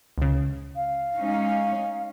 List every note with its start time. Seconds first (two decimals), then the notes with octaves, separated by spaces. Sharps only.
0.18 C#2 C#3
0.76 F5
1.16 G#3 C#4 D#4